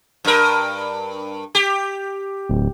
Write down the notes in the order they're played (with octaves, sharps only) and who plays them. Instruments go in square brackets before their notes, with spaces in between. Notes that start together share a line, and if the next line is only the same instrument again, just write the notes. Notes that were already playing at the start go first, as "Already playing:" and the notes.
[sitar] G2 A#4
G4
[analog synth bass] D1